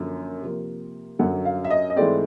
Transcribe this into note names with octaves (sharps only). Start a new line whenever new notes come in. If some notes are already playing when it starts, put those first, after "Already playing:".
Already playing: F#2 D3 F3 A#3
C3 F3 A#3
F#2 D3 F#3 F#5
F5
E5
D#5
D#5
G#2 E3 A3 C4 D5